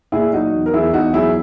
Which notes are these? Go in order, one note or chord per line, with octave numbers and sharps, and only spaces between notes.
A#2 E4 G#4
F#3 D#4 F#4
E2
A#4
E2 E4 G#4
E2 D#4 F#4
F#3 E4 G#4